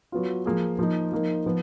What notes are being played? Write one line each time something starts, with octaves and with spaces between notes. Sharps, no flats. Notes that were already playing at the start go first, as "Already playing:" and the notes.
F#3 B3 F4
F3 A#3 F4 G#4
F3 A#3 D#4
F3 A#3 D#4 A#4
F3 B3